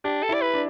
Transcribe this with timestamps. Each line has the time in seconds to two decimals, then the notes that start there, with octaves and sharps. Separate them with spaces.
0.04 D4 G4
0.23 A4
0.29 E4 D5
0.42 B4
0.54 D4